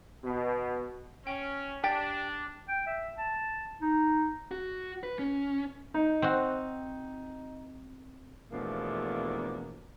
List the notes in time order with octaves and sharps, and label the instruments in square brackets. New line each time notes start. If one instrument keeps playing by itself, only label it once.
[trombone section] B2
[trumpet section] C#4 [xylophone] G5
[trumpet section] D4 [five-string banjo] G4 [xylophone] G5 A6 B6
[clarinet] G5
E5
A5
D#4
[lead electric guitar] F#4
B4
C#4
[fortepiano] D#4
[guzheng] C4 F#4
[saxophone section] E2 B2 F3 A3 A#3 D4